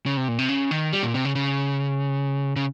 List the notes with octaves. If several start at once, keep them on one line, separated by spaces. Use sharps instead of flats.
C#3
C3
A#2
C3
C#3
D#3
G3
A#2
C3
C#3
C#3
C#3